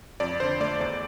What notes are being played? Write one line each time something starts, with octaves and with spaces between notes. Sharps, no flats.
F2 D5
D3 C5
A3 D5
E2 D5